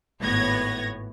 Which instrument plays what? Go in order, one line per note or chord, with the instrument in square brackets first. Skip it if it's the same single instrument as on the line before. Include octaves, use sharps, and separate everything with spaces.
[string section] G#1 A2 B3 C#5 G#6 A#6